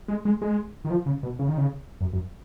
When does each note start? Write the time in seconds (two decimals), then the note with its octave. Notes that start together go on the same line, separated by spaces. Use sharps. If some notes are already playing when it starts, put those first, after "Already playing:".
0.08 G#3
0.25 G#3
0.42 G#3
0.85 D#3
0.90 F3
1.06 C#3
1.23 B2
1.39 C#3
1.48 D#3
1.58 C#3
2.01 F#2
2.13 F#2